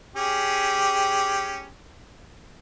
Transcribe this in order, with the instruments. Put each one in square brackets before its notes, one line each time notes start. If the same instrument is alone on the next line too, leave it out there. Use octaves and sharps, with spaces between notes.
[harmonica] C#4 G4 G#4